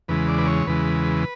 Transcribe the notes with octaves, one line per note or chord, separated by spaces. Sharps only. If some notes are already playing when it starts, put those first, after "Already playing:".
E2 C#3 E3 G#3 B4
D5
B4
C#5
E2 C#3 E3 G#3 B4